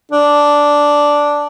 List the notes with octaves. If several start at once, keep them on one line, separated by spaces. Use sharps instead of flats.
D4